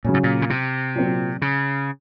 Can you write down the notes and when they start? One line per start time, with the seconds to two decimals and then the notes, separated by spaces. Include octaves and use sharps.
0.05 A#2 C#3 F#3 C#4
0.14 G#2
0.24 A#2
0.42 C#3
0.50 C3
0.95 A#2 F#3 C4
1.42 C#3